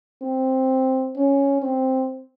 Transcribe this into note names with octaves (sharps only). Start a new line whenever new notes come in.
C4
C#4
C4